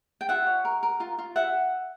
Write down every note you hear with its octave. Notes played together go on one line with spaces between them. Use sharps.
G5
F4 E5 F#5
C#5
A#4
A#4
F4
F4
E5 F#5